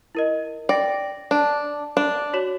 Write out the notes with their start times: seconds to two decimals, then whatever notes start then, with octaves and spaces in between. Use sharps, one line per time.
0.15 E4 A#4 D#5
0.69 D5 G5 A#6
1.31 D4 A5
1.97 D4
2.33 F#4 C#5 E7